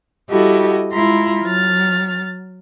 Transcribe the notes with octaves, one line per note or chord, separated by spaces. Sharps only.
G3 E4 F#4 G4 A4 D#5
G#3 E4 F4 A#5 C6
F#3 F6 A6